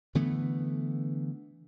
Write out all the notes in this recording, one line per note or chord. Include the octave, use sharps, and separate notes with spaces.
D3 E3 A3 B3